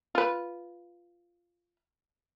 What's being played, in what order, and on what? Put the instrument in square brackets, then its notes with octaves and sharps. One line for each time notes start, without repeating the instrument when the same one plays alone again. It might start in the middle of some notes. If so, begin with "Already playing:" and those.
[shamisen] F4 B4